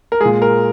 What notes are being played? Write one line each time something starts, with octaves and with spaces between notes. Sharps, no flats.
A#4
A#2 G#3 G#4
A#4